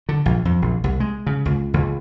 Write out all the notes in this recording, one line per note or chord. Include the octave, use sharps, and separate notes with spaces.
D3
A#1
F2
A#1
C2
G#3
C#3
C#2
C#2